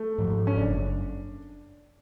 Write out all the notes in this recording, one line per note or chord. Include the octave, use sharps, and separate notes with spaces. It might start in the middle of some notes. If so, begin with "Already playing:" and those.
Already playing: A3
G#2 F3
C#4
F#1 D4